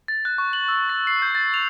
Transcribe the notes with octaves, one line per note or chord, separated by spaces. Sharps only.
A6
F#6
C#6
F#7
E6
A6
C7
G6
A6
F7